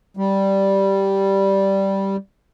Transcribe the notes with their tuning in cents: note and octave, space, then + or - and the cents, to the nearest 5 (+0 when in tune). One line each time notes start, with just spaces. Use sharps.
G3 -5